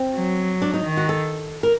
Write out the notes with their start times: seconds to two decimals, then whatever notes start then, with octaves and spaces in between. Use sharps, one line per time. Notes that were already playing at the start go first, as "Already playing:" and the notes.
Already playing: C4
0.14 F#3
0.62 D4
0.74 D#4
0.85 D#3
0.97 F#4
1.09 A4
1.63 A#4